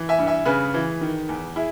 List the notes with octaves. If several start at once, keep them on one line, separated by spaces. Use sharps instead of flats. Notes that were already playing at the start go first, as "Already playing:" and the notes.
Already playing: E3
E5 G#5
G2
E5 G#5
C#3 G#4 B4
E3
D#3
E2
E4 G#4